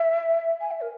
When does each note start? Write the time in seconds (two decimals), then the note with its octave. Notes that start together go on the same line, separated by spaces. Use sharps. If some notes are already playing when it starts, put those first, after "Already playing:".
Already playing: E5
0.61 G#5
0.71 E5
0.81 A#4